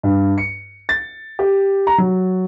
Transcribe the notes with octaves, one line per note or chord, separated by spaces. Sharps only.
G2
C#7
A6
G4
A#5
F#3